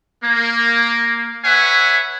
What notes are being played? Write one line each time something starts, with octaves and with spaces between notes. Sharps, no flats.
A#3
B4 C#5 E5 F#5 G#5